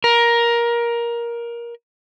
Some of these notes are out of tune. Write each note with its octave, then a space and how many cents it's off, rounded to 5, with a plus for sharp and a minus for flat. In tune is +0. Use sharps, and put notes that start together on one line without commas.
A#4 +15